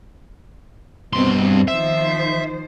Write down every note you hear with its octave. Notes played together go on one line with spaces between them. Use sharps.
G2 B2 B3 C4 C6
D#3 F3 C5 E5